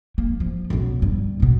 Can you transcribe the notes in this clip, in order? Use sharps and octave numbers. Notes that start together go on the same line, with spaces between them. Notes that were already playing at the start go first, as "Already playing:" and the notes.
A#3
F3
B1 F#2
D2 G2
A1 B2